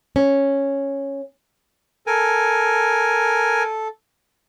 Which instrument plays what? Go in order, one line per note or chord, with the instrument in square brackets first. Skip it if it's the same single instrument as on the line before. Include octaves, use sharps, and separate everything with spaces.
[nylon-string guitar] C#4
[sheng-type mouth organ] A4 [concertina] A#4 G#5